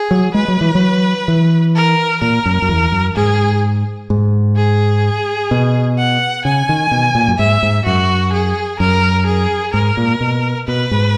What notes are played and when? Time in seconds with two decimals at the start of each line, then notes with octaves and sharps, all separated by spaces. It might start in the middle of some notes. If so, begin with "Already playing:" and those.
Already playing: G#4
0.11 F#3
0.34 G#3 B4
0.48 F#3
0.61 E3
0.75 F#3
1.28 E3
1.76 A#4
2.22 A#2 A#4
2.46 F#2
2.62 F#2
2.69 E2
2.92 F#2
3.16 G#2 G#4
4.10 G#2
4.56 G#4
5.51 B2
5.99 F#5
6.45 C#3 G#5
6.69 D#3
6.91 B2
7.15 A#2
7.28 F#2
7.38 G#2 E5
7.63 G#2
7.85 F#2 F#4
8.33 G#4
8.80 F#2 A#4
9.26 G#4
9.74 G#2 A#4
9.97 A#2
10.21 B2
10.68 B2 B4
10.91 G#2